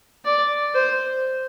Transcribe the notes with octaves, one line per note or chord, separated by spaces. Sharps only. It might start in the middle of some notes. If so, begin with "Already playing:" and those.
D5
C5